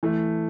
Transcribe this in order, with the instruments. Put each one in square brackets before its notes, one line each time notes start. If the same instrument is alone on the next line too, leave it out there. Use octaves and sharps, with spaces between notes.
[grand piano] E3 A3